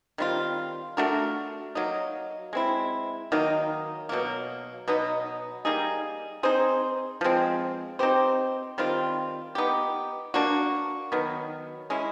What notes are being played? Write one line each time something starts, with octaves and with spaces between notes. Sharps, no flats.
D#3 G3 C4 F4
A3 D4 F#4 A#4
F#3 A#3 D#4
G#3 C4 E4
D#3 F#3 A#3 D#4
B2 F#3 A#3
B2 F#3 B3 D#4
G3 A#3 D#4 G#4
C4 D#4 G#4 C5
F3 G#3 C4
C4 D#4 G4 C5
D#3 G3 C4 F4
B3 D#4 G4
A#3 D4 F#4
D#3 F#3 B3
G#3 C#4 E4